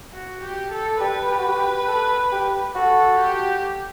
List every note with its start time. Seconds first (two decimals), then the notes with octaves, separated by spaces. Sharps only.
0.14 F#4
0.43 G4
0.72 A4
1.01 G4 B4
1.30 G4
1.39 F#4
1.49 G4
1.59 G4
1.88 A4
2.32 G4
2.75 F#4 A4
3.19 G4